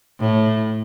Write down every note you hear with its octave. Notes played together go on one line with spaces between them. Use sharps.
A2